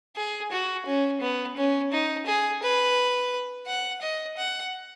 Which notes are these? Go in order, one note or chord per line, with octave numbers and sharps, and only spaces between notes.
G#4
F#4
C#4
B3
C#4
D#4
G#4
B4
F#5
D#5
F#5